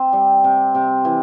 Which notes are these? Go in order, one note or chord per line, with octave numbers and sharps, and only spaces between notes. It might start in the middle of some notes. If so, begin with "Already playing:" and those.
Already playing: C4
G3
C3
C3
E3